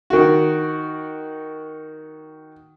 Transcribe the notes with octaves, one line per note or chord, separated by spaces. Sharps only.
D#3 F#4